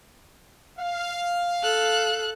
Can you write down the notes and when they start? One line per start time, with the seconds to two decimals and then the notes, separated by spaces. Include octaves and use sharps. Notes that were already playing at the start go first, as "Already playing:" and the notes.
0.79 F5
1.63 A4 F#6